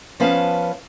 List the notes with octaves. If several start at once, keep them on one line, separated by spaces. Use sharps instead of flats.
F3 B3 C#4 B4 F5 A5